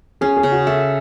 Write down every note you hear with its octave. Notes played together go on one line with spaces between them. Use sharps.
C#4 G#4
G#4
C#3
F#4
A4 E5